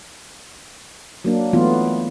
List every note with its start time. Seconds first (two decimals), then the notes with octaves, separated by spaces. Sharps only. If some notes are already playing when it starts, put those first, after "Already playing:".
1.25 F#3 A#3 D4
1.53 E3 F#3 A3 B3 F4